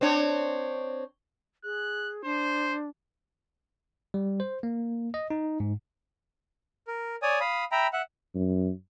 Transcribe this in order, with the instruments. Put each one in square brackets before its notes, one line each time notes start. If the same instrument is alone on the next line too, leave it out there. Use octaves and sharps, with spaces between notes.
[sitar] C4 D4 C#5
[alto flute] G#4 [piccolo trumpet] F#6
[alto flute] D4 [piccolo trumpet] C5
[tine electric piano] G3
C5
A#3
D#5
D#4
G#2
[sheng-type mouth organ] A#4
C#5 D5 G#5 D#6
F5 B5 D#6
E5 G5 A#5 B5
E5 F#5
[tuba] F#2